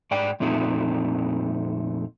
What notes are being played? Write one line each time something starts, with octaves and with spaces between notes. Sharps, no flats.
G#2 D5 G5
F2 A#2 A3 C4 D#4